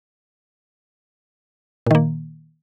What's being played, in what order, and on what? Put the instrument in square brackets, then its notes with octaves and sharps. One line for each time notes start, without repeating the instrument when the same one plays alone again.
[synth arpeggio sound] A#2
D#3
A#3